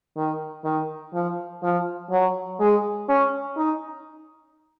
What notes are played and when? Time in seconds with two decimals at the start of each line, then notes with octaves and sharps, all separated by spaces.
0.17 D#3
0.64 D#3
1.13 F3
1.63 F3
2.11 F#3
2.60 G#3
3.09 C#4
3.57 D#4